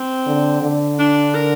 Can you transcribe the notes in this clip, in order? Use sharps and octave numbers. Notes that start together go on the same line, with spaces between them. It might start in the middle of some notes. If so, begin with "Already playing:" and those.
Already playing: C4
D3
D3
D4
A#4